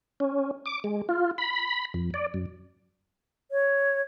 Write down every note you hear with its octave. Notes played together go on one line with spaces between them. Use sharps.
C#4
D6
G#3
F4
B5
F2
D5
F#2
C#5